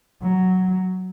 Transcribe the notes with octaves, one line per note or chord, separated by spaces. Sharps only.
F#3